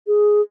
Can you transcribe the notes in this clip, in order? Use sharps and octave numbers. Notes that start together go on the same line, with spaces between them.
G#4